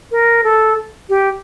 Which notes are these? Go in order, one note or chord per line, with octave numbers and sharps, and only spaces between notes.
A#4
A4
G4